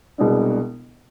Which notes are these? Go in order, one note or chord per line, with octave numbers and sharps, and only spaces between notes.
C2 B2 G#3 B3 D4